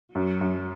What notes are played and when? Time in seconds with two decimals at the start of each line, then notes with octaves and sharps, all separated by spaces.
0.15 F#2 F#3
0.41 F#2